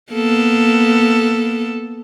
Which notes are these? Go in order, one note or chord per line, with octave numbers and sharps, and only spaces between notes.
A#3 B3 A4